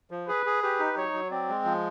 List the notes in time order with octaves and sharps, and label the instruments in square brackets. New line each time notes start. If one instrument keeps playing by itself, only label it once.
[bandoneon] F3
[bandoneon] G#4 [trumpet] B4
[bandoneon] G#4
[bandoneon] G4 [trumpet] B4
[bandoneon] D#4
[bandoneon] F#3 [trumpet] C#5
[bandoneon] F#3
[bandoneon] C4 [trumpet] D5
[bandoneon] G#3
F3